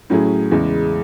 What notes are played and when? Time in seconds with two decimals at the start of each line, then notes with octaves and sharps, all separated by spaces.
0.10 A2 F#3 C#4 E4 G#4
0.51 E2 C#3 G#3